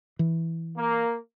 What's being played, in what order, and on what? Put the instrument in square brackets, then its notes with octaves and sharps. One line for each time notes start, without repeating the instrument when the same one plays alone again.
[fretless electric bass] E3
[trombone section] A#3